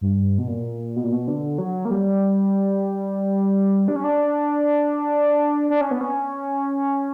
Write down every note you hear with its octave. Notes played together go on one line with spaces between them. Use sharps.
G2
B2
A#2
B2
A#2
B2
D3
F#3
A#3
G3
D4
C#4
D4
D4
C#4
B3
C#4